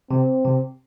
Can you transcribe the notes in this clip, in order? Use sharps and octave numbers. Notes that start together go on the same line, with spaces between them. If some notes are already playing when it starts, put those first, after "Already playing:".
C3 C4
C3